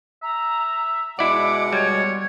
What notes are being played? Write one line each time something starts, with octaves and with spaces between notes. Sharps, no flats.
E5 A#5
B2 G#3 E4 D5 F#5 D6
G3 C#5 G#6